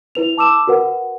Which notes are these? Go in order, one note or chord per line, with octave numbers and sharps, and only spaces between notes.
E4 B4 F7
A5 D6 E6 E7
F#4 A#4 B4 F#5